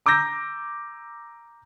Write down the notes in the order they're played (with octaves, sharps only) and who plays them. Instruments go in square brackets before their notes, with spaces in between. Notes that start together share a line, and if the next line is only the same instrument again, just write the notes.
[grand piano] A#5 D6 E6 G6 A#6